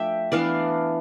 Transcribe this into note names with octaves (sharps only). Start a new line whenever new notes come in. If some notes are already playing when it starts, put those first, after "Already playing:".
Already playing: F3 A3 D4 E5 G5
E3 B3 D4 D5 F5